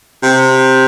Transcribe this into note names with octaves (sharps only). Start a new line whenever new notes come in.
C3